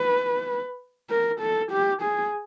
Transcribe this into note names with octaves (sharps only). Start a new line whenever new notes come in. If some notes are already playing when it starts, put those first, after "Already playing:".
Already playing: B4
A#4
A4
G4
G#4